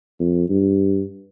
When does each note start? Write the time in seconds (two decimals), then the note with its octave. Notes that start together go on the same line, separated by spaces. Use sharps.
0.20 F2
0.50 G2